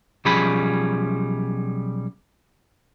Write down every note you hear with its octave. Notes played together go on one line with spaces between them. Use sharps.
B1 F3 G3 C#4 G#4 B5